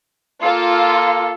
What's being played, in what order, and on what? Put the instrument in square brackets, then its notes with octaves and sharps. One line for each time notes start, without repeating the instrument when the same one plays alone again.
[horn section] A#3 A4 [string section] F4